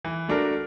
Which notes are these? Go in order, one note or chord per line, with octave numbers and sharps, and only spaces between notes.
E3
A3 D4 F#4 A#4